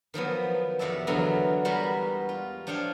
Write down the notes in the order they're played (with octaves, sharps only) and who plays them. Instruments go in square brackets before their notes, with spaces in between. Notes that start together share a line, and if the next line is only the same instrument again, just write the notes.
[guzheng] D#3 F3 F#3 B3
F2 C3 F#4 D5 E5 A5
E2 D3 F#3 B3 A#4 A#5
G3 G#3 B3 F#4 A#4
F4
F3 D4 C#5 F5 G5